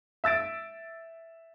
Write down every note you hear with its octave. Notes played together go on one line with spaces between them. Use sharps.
E5 E6 A6 D7